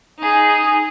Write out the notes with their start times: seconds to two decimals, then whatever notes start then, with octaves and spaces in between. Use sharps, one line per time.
0.18 D#4 G#4